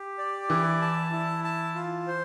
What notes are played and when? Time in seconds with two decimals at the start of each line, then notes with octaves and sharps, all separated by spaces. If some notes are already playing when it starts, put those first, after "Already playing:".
Already playing: G4
0.18 D5
0.49 E3 E4
0.82 A5
1.12 E4
1.44 A5
1.75 F4
2.07 C5